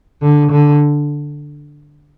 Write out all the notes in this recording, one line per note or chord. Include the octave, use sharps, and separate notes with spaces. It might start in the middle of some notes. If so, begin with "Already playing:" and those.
D3
D3